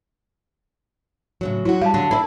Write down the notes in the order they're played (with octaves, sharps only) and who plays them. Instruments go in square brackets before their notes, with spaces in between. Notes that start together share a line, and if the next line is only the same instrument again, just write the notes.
[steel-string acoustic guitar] A2 C#3 F#3
[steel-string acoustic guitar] F#3 F#4 [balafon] E4
[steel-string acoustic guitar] G3 [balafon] F5 A5
[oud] D3 [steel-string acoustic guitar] F#3
[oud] E4 [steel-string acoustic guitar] A4 B4 D5